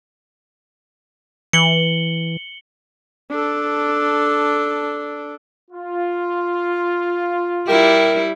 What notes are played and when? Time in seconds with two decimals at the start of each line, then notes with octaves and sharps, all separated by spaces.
1.53 E3 C#7 F#7 G7
3.30 D4 A4
5.71 F4
7.68 G3 E4 G4 A#4